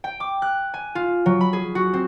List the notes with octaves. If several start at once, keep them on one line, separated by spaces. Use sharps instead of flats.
G5
D6
F#6
G#5
F4
F#3
B5
G#4
F#4
C4